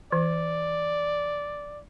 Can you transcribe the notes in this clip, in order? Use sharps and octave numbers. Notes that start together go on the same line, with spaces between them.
E3 D5